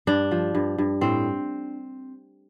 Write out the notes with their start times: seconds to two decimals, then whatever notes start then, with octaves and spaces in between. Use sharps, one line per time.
0.07 G2 D4
0.31 F3
0.55 G2
0.78 G2
1.01 A2 C4